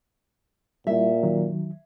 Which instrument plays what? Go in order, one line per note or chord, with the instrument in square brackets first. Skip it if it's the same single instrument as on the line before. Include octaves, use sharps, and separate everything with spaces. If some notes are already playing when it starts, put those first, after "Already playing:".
[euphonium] A#2 [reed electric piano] G3 E4 [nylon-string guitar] E5
[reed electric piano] D#3 F#3